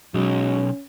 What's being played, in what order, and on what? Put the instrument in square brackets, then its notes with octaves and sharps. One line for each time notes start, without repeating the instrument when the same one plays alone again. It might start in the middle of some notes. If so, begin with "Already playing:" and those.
[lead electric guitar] B1 [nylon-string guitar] F#3 G#3 [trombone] C#4